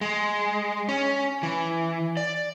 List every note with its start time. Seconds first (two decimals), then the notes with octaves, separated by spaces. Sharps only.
0.01 G#3
0.89 C#4
1.43 E3
2.17 D5